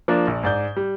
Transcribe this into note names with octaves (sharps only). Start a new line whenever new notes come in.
F3 A#3 D4
A#1
G#2 D5 G6
G3